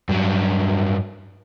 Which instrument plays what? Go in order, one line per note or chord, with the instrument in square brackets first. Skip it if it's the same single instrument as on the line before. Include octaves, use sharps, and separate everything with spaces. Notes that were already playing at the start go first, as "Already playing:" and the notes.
[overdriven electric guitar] G2 F#3